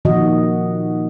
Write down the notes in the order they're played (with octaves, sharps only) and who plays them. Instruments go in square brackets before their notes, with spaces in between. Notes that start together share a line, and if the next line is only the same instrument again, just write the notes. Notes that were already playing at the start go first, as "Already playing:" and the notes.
[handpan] A#2 D#3 F3 F#4 D#5